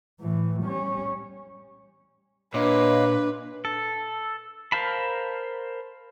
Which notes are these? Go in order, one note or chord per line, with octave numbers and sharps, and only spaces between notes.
A2 E3
G3 C#4
A#2 D4 B4 C#5 D#5 F5
A4
A#4 C5 F5 A5 B5